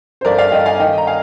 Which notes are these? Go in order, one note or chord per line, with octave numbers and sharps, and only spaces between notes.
C5
G1 A#4 D5
D5 F5
G1 D#5 G5
F5 G#5
D#3 D#5 G5
A#5
F5 G#5